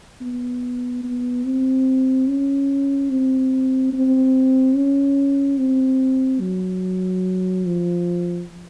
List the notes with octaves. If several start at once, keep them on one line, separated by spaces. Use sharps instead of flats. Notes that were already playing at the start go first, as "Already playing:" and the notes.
B3
B3
C4
C#4
C4
C4
C#4
C4
F#3
F3